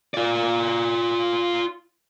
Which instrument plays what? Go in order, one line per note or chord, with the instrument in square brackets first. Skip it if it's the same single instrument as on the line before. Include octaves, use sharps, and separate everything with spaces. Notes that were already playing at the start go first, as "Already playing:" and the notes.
[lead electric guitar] F4 D5